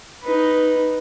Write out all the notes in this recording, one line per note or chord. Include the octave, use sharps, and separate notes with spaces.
D#4 B4